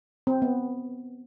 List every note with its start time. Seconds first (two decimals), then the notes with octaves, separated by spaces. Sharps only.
0.27 C4
0.42 B3